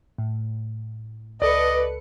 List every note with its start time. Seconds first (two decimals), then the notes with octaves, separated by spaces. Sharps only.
0.18 A2
1.42 C#2 A4 B4 D5 D#5 C#7